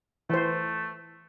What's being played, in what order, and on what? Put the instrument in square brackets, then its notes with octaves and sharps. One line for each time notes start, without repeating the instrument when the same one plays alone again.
[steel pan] E3 C5 [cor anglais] A3